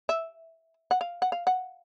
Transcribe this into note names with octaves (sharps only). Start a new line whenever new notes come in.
E5
F#5
F5
F#5
F5
F#5